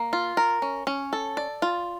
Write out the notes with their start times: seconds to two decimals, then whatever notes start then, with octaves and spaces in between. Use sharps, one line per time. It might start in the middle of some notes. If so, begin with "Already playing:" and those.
Already playing: A#3
0.13 F4
0.37 A#4
0.62 C#4
0.87 C#4
1.13 A4
1.37 D5
1.62 F4